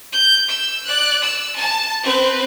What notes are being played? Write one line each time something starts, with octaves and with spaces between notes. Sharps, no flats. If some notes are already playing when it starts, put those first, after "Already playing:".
G6
E6
D5 F#6
E6
A5
C4 B4